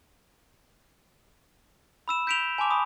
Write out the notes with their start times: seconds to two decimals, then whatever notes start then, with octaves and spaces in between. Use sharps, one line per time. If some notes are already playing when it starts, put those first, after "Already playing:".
2.08 B5 E6 E7
2.27 G6 B6 D7 E7 F7 G7
2.58 G#5 A5 C6 D6 F7
2.71 B5 C#6 D#6